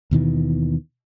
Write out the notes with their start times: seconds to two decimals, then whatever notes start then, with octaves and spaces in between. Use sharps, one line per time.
0.11 D#2 B2 D#3 E3